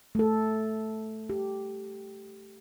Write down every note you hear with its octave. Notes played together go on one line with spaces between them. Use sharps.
A3 A4
G4